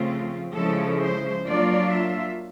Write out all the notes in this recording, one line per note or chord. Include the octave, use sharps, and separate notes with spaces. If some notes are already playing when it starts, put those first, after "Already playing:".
Already playing: C#3 F3 A3 C4 F4
C#3 F3 G#3 C#4 E4 A4
C5
F#3 A#3 D4 F4 D5
E5